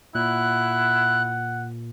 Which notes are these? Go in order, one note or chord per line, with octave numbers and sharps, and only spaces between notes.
A#2 E4 F#5 F#6